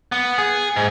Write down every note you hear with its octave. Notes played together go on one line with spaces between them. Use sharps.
B3
G#4
G#2